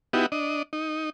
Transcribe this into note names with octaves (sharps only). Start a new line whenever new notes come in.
B3 D#4 E4 F#4 G4
D4 D#5
D#4